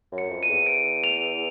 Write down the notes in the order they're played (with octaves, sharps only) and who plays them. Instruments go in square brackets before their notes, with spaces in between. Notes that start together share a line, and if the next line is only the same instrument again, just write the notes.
[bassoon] F#2
[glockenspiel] C#7
[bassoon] F2
[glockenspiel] D#7
[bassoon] E2
[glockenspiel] D7
F7